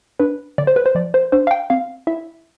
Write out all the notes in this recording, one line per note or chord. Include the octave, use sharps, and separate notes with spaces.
D4 B4
D3 D5
C5
B4
C5
F3 D5
C5
D4 C5
F5
G5
C4 F5
E4 E5